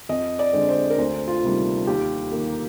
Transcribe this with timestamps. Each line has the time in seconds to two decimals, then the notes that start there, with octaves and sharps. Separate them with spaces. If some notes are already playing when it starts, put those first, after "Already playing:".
0.09 F2 D#5
0.39 D5
0.53 D3 G#3 C4
0.69 C5
0.91 A#4
0.98 D2 C5
1.28 F4
1.43 C3 D#3 G3 A#3
1.87 D#2 G4
2.32 D#3 A#3